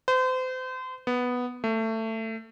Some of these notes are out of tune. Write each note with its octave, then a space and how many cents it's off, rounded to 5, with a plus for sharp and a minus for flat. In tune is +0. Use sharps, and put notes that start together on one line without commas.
C5 -35
B3 +0
A3 +20